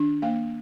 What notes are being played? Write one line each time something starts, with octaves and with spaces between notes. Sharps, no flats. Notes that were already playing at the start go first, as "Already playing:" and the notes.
Already playing: D#3 D4
A#3 F5